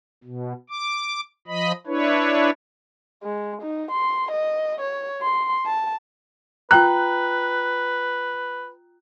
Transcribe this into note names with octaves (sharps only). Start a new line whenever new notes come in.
B2
D6
F3 D#5 B5
D4 E4 B4 C#5
G#3
D#4
C6
D#5
C#5
C6
A5
F4 B4 G5 A#5 F#6